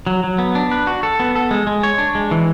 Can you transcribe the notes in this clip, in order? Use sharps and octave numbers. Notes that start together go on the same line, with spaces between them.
F#3
F#3
B3
D4
B4
F#4
A4
B3
A4
G#3
G#3
C#5
D4
G#3
E3